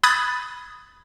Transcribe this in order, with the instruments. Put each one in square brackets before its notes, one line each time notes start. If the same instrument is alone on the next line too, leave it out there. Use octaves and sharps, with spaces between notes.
[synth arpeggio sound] B5 D#6 F#6 G#6 A6